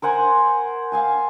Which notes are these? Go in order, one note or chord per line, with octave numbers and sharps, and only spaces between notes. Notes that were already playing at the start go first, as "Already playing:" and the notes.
A#4 C5 F#5 G#5
F5 G#5 A5